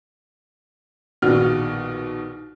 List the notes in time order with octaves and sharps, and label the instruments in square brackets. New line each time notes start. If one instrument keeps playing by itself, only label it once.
[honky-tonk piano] A#1 B2 D#3 F4 F#4 F6